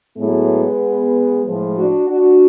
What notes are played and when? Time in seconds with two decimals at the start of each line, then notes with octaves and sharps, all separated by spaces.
0.17 A2 F#3 G#3 B3
1.45 A2 F3 G#3
1.77 D4 F#4
2.09 D4 F#4